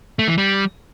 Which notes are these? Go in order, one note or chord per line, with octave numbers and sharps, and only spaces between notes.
A3
E3
G3